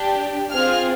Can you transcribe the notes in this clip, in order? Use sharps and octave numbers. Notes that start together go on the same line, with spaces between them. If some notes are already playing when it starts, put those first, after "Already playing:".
Already playing: D4 G4
C4 F4 G#4 F6